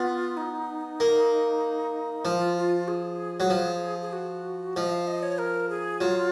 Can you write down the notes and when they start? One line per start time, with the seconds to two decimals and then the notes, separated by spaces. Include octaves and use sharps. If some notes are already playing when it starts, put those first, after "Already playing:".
Already playing: B3 F4
0.37 D#4
1.00 A#3
2.25 F3 F4
2.57 F4
2.88 G#4
3.40 F#3
3.50 F3
4.01 G#4
4.13 F#4
4.76 F3 D#5
4.92 F5
5.07 D#5
5.23 C#5
5.38 A#4
5.69 G#4
6.01 F#3 F4